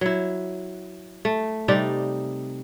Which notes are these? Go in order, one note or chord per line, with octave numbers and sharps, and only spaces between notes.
F#3 E4
A3
C3 G3 D#4 D5